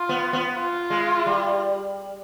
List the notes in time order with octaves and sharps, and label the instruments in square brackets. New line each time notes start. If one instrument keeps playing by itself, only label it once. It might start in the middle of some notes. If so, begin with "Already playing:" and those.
Already playing: [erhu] F4
[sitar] B3
B3
[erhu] F4
[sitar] G#3
G3